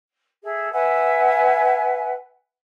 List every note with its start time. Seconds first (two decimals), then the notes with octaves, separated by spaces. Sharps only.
0.43 G#4 A4 E5
0.72 B4 E5 F#5 G#5